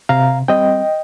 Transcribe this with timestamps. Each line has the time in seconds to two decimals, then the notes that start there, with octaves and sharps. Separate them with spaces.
0.09 C3 F5 A#5
0.48 G3 C4 D#5 G5